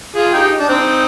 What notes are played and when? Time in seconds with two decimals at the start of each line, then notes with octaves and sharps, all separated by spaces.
0.15 F4 G#4
0.33 D#4 G4
0.59 D4
0.69 C4 D#4